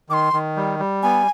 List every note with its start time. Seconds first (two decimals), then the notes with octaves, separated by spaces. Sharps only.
0.10 D#3 D6
0.13 C6
0.33 D#3
0.57 G3
0.79 G3
1.03 B3 G#5